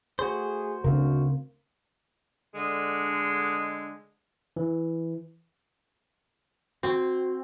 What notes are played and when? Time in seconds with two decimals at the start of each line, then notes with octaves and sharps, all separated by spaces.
0.19 A3 F#4 G#4 C5
0.84 D2 C#3 C4 A#4 F5
2.55 D3 G#3
4.56 E3
6.83 C4 F#4